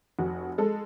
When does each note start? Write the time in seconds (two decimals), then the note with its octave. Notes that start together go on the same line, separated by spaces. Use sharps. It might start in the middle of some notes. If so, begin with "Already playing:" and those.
0.19 F1 F#4
0.58 G#3 A4